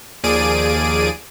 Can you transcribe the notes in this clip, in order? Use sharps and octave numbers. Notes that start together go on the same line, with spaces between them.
D#2 F3 G#4 D5 D7 D#7